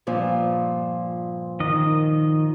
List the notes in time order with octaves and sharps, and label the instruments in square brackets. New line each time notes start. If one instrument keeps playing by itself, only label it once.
[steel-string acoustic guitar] G2 A#2 F3
[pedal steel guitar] D#3 D#5